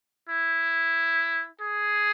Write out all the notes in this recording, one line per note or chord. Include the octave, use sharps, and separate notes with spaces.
E4
G#4